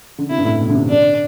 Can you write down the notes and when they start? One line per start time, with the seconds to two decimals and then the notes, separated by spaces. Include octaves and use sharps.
0.18 D3
0.30 C3 E4
0.38 G2
0.45 A2
0.60 B2
0.69 D3
0.75 C3
0.89 D3 D4